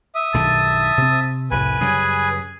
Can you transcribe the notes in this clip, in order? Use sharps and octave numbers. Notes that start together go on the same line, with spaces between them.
E5 D#6
B1 G2 D#3 A5
C3 C4
C2 F2 A2 B4 G#5
F#2 C#3 G3 G#4